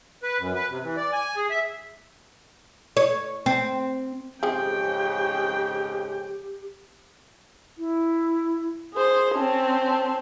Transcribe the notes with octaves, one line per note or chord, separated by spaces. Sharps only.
B4
F#2
B4
C3
E3
D5
G#5
G#4
E5
C#5
C4
F2 G#2 C#3 F3 C4 G4 G#4 G5
E4
G#4 C5 D#6
C4 C#4 A5